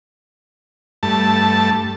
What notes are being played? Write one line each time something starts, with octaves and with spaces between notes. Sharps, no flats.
G2 A3 A5